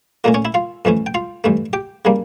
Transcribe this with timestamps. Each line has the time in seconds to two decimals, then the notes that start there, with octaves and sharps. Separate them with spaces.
0.24 A#2 A3 A#3 C#4 A#4
0.34 C#4 C#5
0.45 E4 E5
0.54 F4 F5
0.85 F2 E3 A3 C#4
1.06 G5
1.14 F4 F5
1.44 G2 E3 A3
1.73 G4 G5
2.05 C#3 G3 A#3